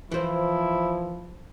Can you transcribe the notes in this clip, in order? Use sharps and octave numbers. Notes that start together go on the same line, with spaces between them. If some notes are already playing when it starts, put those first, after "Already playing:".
E3 F3 E4 C5